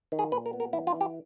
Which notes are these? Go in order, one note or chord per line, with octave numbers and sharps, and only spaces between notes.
D#3
G#4
A#2 B4
A#4
B3
A#4
E3 E4
F4
E3
G4